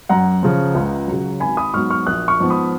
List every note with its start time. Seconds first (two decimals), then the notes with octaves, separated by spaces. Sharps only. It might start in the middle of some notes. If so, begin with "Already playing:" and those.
0.09 F#2 F#5 A#5
0.43 C#3 F3
0.75 C#2
1.08 C#3 F#3
1.40 G#1 G#5 B5
1.57 B5 D#6
1.74 G#2 F#3 B3 C#6 F6
1.90 C#6 F6
2.06 A#1 D#6 F#6
2.28 C#6 F6
2.39 G#2 F3 B3
2.50 B5 D#6